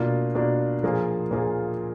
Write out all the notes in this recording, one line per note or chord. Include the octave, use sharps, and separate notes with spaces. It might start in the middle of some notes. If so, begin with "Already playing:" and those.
Already playing: B2 A#3 D4 F4
B2 A#3 D4 F4
A#2 F3 A#3 F4 G#4
A#2 F3 A#3 F4 G#4